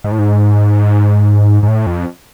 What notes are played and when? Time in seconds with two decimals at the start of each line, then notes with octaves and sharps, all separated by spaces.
0.04 G#2
0.12 A2
0.19 G#2
1.63 G#2
1.68 A2
1.86 F2